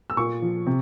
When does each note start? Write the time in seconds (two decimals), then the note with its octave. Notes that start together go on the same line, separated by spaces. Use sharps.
0.10 E6
0.17 A#2 C#6
0.42 F3
0.67 C3